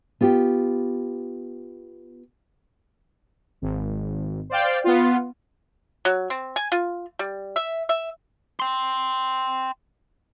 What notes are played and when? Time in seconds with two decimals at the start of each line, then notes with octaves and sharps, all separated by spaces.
0.21 B3 F4 G4
3.62 G#1
4.50 C5 D5 F5 G5
4.84 B3 F4
6.05 F#3
6.30 C4
6.56 G#5
6.72 F4
7.19 G3
7.56 E5
7.89 E5
8.60 G5 C6